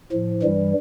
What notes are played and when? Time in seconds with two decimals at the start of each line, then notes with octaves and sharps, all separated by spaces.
0.12 A2 F3
0.43 G2 E3 G3